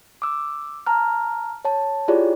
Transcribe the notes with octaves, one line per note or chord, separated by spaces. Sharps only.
D6 E6
A5 A#5 F6
C#5 A5
E4 F4 G4 G#4 C#5 D5